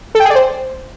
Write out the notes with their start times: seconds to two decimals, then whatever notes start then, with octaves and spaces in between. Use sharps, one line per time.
0.15 A4
0.20 G5
0.25 G#4
0.30 D5
0.35 C5